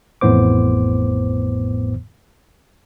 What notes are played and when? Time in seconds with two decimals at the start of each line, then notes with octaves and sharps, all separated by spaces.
0.21 A1 F2 A2 B3 C5 D6